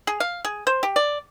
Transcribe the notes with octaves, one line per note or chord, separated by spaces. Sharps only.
G#4
F5
G#4
C5
G4
D5